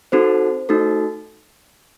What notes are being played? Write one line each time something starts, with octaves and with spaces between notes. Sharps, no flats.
C4 D#4 F#4 A4 C5
A3 D#4 F#4 A4